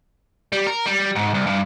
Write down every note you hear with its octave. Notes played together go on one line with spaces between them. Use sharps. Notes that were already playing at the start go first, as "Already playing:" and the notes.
G3
A#4
G3
G#2
C2
G2